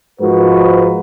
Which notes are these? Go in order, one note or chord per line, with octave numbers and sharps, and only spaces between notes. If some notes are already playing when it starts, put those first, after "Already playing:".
G#2 F3 G#3 F#4 A#4 B4